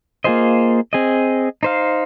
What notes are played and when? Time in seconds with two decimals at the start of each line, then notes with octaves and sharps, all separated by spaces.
0.24 A#3 F4 G#4 C5 D#5
0.93 C4 G#4 D#5
1.63 D#4 C5 F5